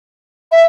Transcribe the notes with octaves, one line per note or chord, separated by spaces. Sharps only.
E5